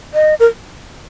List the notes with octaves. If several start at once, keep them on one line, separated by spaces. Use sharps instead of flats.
D#5
A#4